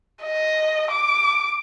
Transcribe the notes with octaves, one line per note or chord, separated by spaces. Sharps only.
D#5
D6